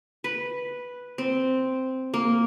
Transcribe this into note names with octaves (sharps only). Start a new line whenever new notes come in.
B4
C4
A#3